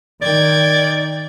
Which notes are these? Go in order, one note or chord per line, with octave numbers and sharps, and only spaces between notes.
D#3 D5 G5 G#6